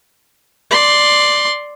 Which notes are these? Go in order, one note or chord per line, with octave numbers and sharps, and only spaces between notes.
D5 C6